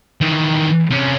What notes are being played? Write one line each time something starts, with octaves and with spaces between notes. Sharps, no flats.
D#3 E3
C3 C#4